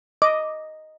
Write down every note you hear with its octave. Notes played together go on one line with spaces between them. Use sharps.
D#5 D6